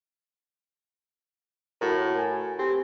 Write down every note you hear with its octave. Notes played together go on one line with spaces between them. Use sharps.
A2 F#4 A#4
G#5
C4 G4